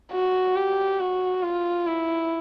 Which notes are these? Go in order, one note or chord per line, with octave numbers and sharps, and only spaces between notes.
F#4
G4
F#4
F4
E4